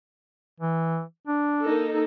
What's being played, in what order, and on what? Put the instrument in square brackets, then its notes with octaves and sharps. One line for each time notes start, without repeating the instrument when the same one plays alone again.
[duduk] E3
D4
[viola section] A#3 D#4 A4